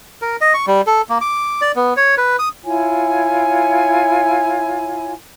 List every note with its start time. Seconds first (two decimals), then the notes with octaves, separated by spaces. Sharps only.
0.22 A#4
0.41 D#5
0.54 C#6
0.67 G3
0.87 A4
1.09 A#3
1.21 D6
1.61 D5
1.76 B3
1.97 C#5
2.17 B4
2.39 D#6
2.64 E4 F4 C#5 G#5